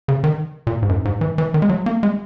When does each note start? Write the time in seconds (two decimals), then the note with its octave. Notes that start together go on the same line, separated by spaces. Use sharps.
0.08 C#3
0.24 D#3
0.67 A#2
0.82 G#2
0.89 F#2
1.05 G#2
1.21 E3
1.38 E3
1.54 D#3
1.62 G#3
1.69 F#3
1.86 A#3
2.03 G#3